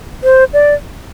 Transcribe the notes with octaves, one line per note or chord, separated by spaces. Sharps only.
C5
D5